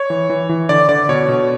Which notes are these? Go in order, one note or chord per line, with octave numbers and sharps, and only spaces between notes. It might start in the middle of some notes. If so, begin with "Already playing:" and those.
Already playing: C#5
E3
E3
E3
D3 D5
D3 D5
B2 C#5
B2